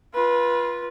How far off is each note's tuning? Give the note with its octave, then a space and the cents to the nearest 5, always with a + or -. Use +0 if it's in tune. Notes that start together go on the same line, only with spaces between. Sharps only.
F4 +0 B4 -25